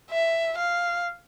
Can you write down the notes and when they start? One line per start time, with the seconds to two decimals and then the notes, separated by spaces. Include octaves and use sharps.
0.11 E5
0.58 F5